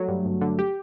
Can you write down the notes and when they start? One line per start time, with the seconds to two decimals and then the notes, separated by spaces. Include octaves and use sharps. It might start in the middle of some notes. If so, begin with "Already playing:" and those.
Already playing: F#3 A3
0.08 G2
0.25 G1
0.41 D3
0.59 G4